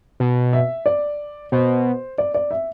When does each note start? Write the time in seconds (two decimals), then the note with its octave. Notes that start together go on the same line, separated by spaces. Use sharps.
0.20 B2
0.53 E5
0.86 D5
1.52 B2 C5
2.18 D5
2.34 D5
2.51 E5